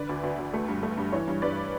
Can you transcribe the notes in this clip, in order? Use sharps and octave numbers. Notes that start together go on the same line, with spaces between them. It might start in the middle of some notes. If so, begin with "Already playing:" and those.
Already playing: D3 B4 D5
D2
D2
D2
A3
G2
A3
G2
E3 C#5
G2
G2 B4 D5